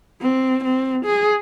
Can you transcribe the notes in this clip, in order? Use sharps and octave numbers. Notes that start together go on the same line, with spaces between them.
C4
C4
G#4